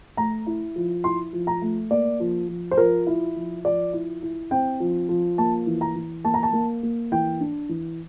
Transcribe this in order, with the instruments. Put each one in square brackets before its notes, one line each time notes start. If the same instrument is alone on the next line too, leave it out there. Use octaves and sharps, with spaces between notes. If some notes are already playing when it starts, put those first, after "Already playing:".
[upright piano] A3 A#5
E4
F3
E4 C6
F3
A#5
A3
A#3 D5
F3
F3
C5
F3 A#4
E4
F3
F3 D5
E4
E4
C4 G5
F3
F3
A#3 A5
E3
A#5
E3
A#3 A5
A#5
A5
A#3
A#3
E3 G5
D4
E3